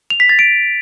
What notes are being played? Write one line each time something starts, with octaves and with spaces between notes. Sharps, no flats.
F7
B6
A6
D7